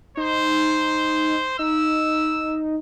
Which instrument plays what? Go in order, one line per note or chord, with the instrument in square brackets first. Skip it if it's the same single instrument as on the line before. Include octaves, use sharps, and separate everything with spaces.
[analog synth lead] D#4 [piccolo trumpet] C5
[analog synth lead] D#4 [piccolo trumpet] E6